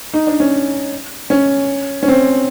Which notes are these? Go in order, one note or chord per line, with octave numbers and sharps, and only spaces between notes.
D#4
D4
C#4
C#4
C#4
C4